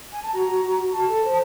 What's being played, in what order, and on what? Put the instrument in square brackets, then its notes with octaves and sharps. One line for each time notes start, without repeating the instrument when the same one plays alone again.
[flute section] G#5
A5
F#4 A#5
F#4
F#4
F#4
F#4 A5
A4
C5